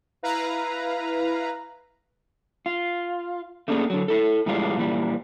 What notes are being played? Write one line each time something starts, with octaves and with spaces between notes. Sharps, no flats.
E4 B4 F5 A#5
F4
A3 A#3 C#4 D4 F#4 G#4
D3 F#3
E4 A4
A2 E3 G3 G#3 F4
A#2 E3 G3